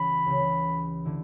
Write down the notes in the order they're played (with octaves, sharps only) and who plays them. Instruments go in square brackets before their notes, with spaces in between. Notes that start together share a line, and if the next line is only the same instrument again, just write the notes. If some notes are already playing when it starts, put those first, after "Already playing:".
Already playing: [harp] C#2 C#3 E3 G3 [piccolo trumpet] B5
[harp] C#2 C#3 E3 G3
D3 A3 E4